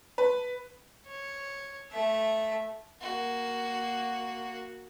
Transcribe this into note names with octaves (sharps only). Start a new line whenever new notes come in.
B4
C#5
A3 E5
A#3 F#4